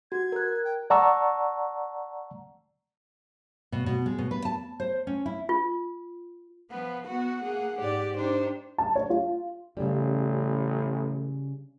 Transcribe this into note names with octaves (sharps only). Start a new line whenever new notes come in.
F#4 G#6
A#4 F#6
G5
D5 F#5 A5 A#5 C#6 E6
B2
B2
G#3
B2
B4
A5
C5
C#4
E4
F4
F3 B3 B4
B3 F#4 F#5
A#3 G#4
G#2 G4 D5
D4 D#4 G4 C5
A5
C#5
F4
A1 C#3 G3